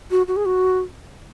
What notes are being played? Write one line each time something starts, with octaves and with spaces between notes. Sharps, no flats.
F#4
F#4
G#4
F#4